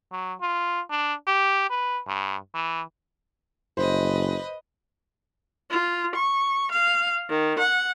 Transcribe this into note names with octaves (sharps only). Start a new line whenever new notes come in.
F#3
F4
D4
G4
B4
G2
E3
F#1 B4 C5 D#5
F4
C#6
F5
D#3
F#5